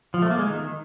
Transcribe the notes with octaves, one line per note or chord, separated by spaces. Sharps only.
F3
A3
A#3
G#3
D#3